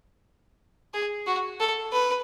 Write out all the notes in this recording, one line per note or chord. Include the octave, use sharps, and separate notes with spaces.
G#4
F#4
A4
B4